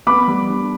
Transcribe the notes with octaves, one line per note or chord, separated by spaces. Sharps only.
B3 B5 D6
G3
D4